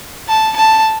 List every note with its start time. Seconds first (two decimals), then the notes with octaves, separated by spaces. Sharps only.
0.28 A5
0.57 A5